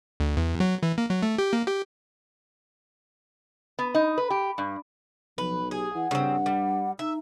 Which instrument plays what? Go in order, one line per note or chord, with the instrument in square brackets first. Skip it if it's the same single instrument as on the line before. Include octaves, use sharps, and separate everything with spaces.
[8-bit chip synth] D2
E2
F#3
E3
A#3
F#3
A3
G4
A#3
G4
[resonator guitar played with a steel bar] B3
D#4
B4
G4
G2
[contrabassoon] B1 [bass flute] F3 [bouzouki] B4
[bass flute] G4 [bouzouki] G#4
[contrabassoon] E3 [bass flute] F#5
[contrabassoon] G2 [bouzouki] C#3 C4
[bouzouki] G3
[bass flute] D#4 [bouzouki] E5